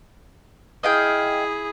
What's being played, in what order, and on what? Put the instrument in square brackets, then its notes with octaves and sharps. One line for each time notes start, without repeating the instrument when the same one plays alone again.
[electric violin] E4 G#4 [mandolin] D#5 F5 G5